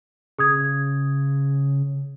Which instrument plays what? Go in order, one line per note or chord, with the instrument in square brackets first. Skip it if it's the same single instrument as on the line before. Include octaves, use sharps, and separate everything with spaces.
[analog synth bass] C#3 [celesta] G#4 D#6 G#6